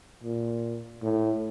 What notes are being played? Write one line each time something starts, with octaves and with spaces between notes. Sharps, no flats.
A#2
A2